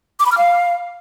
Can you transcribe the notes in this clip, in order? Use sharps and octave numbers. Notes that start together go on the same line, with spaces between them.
D6
B5
F6
F5